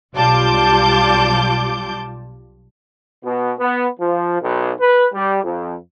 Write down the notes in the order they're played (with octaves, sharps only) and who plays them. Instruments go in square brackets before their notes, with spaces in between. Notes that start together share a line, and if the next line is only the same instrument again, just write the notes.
[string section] B1 G3 F4 A5 D6 G6
[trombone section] B2
B3
F3
B1
B4
G3
F2